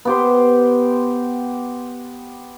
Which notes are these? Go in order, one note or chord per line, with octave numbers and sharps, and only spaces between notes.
B3 G4 C5